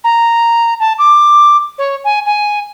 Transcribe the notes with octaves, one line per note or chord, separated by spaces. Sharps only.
A#5
A5
D6
C#5
G#5
G#5